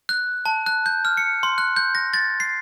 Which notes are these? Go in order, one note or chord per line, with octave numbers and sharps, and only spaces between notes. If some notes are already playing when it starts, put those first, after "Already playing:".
F#6
A5
F#6
G6
F6
C#7
C6
F#6
G6
A#6
A6
C7